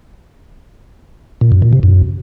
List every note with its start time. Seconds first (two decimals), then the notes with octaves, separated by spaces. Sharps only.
1.41 A#2
1.52 F#2
1.62 A#2
1.73 C3
1.83 F#2